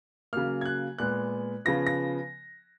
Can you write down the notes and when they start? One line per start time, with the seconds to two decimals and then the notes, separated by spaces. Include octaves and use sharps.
0.33 C#3 F#3 A#3 F6
0.61 G#6
0.65 F#6
0.98 A#2 G#3 B3 F#6
1.65 C#3 F3 B3 A#6
1.87 A#6